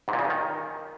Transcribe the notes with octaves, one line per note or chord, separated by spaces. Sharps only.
G#2
A#2
C#3
G2
D#3